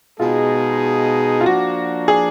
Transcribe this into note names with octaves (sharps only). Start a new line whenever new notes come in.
B2 G#3 D#4 F4 G#4
F4
F3 A#3 D4 F#4
G#4